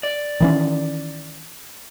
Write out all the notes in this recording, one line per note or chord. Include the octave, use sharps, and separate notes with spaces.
D5
D#3 E3 C#4